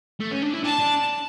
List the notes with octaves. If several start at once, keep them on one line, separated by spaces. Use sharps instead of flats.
A3
C#4
D4
E4
D4 A5
D4